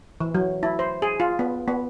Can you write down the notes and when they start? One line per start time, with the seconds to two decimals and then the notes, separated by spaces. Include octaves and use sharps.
0.20 E3
0.35 F#3
0.63 E4
0.79 C5
1.02 G#4
1.20 F4
1.39 B3
1.68 B3